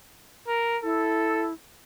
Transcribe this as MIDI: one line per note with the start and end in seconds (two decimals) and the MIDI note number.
0.48 0.77 70
0.84 1.53 64
0.84 1.47 69